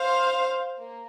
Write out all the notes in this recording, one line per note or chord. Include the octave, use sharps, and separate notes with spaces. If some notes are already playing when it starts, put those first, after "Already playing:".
Already playing: C5 F5
A#3